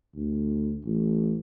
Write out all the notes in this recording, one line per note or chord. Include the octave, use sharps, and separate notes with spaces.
D2
A1